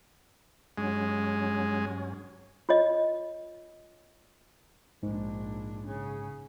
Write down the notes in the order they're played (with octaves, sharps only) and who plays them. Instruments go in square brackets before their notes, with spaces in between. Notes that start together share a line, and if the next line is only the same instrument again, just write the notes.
[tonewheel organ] G2 F#3 C#4 [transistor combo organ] G#3
[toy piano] F4 C#5 D#5
[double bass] A#1 D4 [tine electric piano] G#2
[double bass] C#3